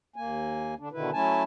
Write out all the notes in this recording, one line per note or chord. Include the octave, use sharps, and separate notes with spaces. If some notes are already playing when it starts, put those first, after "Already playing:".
D#2 A#3 G#5
D3 D4
B2 D3 D#3 E4 B4
F#3 A3 C#4 E4 G#5 A5